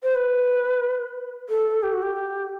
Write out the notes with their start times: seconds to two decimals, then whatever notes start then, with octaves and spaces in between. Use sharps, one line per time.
0.03 C5
0.15 B4
1.49 A4
1.83 G4
1.93 F#4
2.02 G4